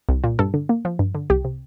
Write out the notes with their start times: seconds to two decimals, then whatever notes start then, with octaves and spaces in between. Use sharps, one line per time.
0.09 C2
0.24 A#2
0.39 G2 A4
0.54 D3
0.69 A#3
0.85 F3
0.99 G2
1.15 D3
1.30 C2 G4
1.44 C3